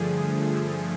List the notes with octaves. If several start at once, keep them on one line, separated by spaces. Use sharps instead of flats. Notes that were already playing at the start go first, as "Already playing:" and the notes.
Already playing: G2 D3 F3 A3 G#4
G#4